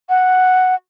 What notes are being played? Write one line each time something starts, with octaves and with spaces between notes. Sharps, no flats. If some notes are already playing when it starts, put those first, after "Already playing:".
F#5